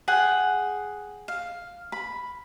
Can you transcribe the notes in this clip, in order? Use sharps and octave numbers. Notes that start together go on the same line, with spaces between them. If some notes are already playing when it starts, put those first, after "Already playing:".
G#4 F#5 G5
F5
B5